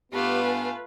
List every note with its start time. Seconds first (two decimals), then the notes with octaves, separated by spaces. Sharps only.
0.12 G2 A3 B3 F4 G4 B4 F5
0.45 G#5